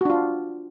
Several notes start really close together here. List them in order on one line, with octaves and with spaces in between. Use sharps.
F#4 D4 F4